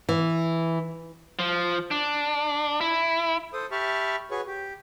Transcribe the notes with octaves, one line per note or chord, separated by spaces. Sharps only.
E3
F3
D4
E4
A4 C5 D#6
G4 E5 A5 B5 C#6 F6
F#4 G#4 B4 C#5 C#6
G4